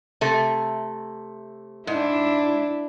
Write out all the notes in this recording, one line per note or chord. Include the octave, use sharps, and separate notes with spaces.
C3 A3
G#2 D4 E4